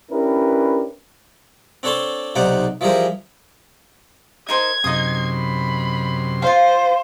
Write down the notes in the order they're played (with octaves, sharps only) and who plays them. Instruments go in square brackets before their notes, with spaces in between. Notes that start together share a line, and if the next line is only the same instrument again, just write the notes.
[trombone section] C#4 D4 E4 G4 A#4 B4
[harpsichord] C4 D4 A4 C#5 A5 C6
B1 C3 D#4 C5 D5 F#5
E3 F3 G3 G#4 A#4 C5
[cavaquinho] D#4 A#4 C5 [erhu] G#6
[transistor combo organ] F#2 C3 C6 [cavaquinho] D#4 D#6
[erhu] B5
[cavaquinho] F4 F5 [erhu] C5